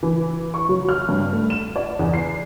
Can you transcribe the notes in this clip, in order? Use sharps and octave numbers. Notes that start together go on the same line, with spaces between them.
E3
C#6
F#3
F6
G2
A3
E7
D5
E2
C7